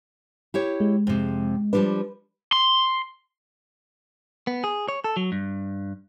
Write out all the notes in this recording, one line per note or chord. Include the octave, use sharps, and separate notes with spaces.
E4 G4 C#5
G#3
F2 C3
F3 G3 D4 B4
C6
B3
G#4
C#5
A4
F#3
G2